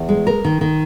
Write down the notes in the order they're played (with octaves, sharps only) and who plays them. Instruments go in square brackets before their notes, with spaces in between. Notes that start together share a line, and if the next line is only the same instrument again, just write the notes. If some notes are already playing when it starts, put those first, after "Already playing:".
Already playing: [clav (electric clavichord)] E2
[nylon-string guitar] G#3
A#4
D#3
D#3